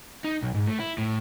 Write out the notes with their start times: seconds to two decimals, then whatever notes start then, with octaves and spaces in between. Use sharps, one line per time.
0.24 D#4
0.43 B1
0.55 G#2
0.68 A3
0.79 E4
0.98 A2